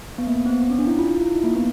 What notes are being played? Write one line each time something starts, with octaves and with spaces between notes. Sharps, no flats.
B3
A#3
B3
C4
B3
C4
C#4
D4
E4
F4
F4
E4
D#4
A#3
B3